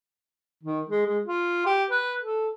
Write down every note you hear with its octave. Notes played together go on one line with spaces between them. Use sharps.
D#3
G#3
G#3
F4
G4
B4
A4